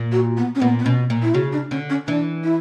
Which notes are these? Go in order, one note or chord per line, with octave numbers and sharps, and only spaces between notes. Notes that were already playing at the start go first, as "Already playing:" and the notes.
Already playing: A#2
F#4
B3
C#4
A#2 B3
B3
B2 C#4
A#2
E4
C#3 F#4
D4
D3 C#4
C#4
E3 D4
E4